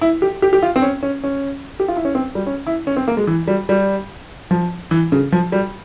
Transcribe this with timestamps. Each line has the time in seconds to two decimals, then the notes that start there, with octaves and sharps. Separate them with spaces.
0.01 E4
0.22 G4
0.42 G4
0.53 G4
0.63 F4
0.76 C4
0.82 C#4
1.03 C#4
1.24 C#4
1.80 G4
1.88 F4
1.97 E4
2.05 C#4
2.15 C4
2.35 G3
2.46 C#4
2.67 E4
2.87 C#4
2.96 C4
3.08 A#3
3.17 G#3
3.27 E3
3.48 G3
3.69 G3
4.51 F3
4.91 E3
5.12 C#3
5.32 F3
5.52 G3